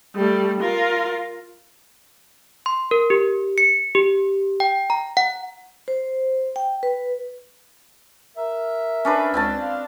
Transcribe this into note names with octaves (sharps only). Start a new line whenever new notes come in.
G3 A3
F4 A#4
C6
A#4
G4
C#7
G4
G5
A#5
F#5
C5
G5
B4
A#4 E5
C#4 D4 B4
C#2 C4 D5 A5
F4 F5